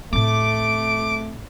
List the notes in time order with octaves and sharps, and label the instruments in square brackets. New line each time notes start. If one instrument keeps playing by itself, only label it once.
[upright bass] A2 C4 [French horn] A3 [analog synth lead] D6